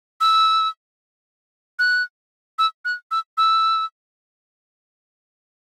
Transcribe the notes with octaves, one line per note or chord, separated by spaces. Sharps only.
E6
F#6
E6
F#6
E6
E6